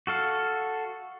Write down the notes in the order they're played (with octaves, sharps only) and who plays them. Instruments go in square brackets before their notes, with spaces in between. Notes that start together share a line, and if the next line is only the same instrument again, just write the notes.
[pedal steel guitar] F#4 A4 F5